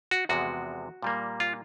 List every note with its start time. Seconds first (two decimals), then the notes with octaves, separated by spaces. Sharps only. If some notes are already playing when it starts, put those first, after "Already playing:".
0.11 F#4
0.29 E2 C3 F3 G#3 B3 F#4
1.02 A#2 G3 A#3
1.40 F4